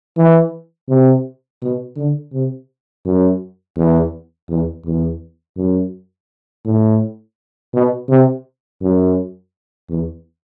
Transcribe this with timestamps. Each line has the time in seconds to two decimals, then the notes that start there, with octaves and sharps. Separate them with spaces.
0.17 E3
0.89 C3
1.62 B2
1.97 D3
2.33 C3
3.05 F#2
3.77 E2
4.49 E2
4.85 E2
5.57 F#2
6.65 A2
7.73 B2
8.09 C3
8.81 F#2
9.89 E2